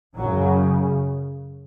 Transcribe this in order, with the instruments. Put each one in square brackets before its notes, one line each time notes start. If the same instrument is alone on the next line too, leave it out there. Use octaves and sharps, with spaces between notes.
[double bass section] F#2 C#3 F#3